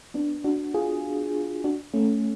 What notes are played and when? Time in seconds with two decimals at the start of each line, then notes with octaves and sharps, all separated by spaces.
0.14 B3 D4
0.44 D4 F#4
0.74 F4 G#4
1.64 D4 F#4
1.94 A3 C#4